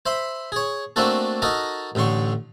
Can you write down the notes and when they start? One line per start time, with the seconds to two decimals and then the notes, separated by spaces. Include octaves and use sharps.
0.06 C5 E5 B5 C6
0.52 G#4 C#5
0.96 A3 A#3 C4 D4 F#4 A4
1.42 D#4 F#4 A4 A#4 D#5 A#5
1.95 A1 A2 D3 C6 C#6